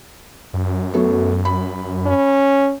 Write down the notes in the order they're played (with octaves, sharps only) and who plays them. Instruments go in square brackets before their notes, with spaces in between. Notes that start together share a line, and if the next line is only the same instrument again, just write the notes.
[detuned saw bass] F#2
[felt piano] F#3 A3 B3
B5
[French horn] C#4